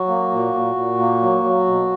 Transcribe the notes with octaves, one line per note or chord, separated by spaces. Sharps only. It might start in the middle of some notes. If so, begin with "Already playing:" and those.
Already playing: F#3 F#4
A#3
A#2
A#2
A#2
A#3
F#3
F#3
B2